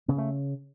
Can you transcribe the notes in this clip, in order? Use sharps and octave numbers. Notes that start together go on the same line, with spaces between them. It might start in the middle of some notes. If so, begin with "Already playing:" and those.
C#3 B3
A3